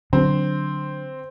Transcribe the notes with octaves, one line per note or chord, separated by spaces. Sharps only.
D3 F#3 C4 D4